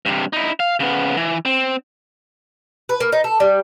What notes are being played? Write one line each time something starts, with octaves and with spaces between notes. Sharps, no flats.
G2 C3
D#4 E4
F5
C#3 B3
E3
C4
B4
A#3
D#4
A4
G3